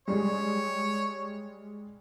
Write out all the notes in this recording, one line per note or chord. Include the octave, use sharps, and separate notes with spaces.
G3 G#3 C#5